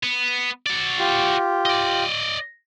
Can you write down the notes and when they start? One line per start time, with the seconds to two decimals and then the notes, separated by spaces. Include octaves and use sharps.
0.03 B3
0.66 F#4 D5
0.99 F4 G4
1.65 D5 D#5